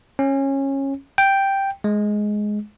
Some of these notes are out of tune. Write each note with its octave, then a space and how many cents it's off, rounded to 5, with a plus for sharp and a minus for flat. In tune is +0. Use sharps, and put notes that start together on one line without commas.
C#4 -20
G5 +0
G#3 +10